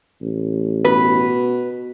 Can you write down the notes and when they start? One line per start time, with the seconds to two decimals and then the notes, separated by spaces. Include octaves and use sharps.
0.21 A1
0.85 B2 B4